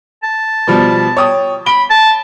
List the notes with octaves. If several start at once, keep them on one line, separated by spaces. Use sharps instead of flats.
A5
B2 F3 G3
C#5 G5 D#6
B5 D7 G7
A5